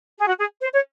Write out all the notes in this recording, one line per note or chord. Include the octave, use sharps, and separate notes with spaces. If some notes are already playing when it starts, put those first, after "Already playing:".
G#4
F#4
G#4
C5
C#5